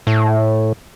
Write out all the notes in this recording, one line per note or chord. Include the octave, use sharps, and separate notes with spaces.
A2